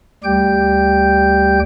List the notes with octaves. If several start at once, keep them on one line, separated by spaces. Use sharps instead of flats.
D2 G3 G4 G5 G6